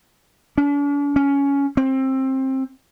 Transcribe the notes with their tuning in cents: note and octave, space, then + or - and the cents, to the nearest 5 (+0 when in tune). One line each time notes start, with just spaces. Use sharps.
D4 -45
C#4 +15
C4 +20